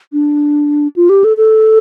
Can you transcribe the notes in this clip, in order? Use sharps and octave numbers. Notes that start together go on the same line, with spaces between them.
D4
F4
G4
A4
A4